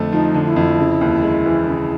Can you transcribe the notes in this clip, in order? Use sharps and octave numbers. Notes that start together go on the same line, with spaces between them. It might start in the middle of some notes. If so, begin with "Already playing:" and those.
Already playing: F2 D3 A3
F3 D#4
D3
E4
F2
C#3
D#2
G#3
E3
C#3